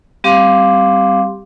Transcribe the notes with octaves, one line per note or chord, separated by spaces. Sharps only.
G3 C4 G4 F5 C6 D6